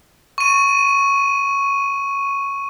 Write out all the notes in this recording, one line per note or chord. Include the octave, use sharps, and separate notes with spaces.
C#6 D#7